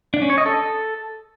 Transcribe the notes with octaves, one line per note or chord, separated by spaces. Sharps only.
D4
C#4
C#5
D#5
A4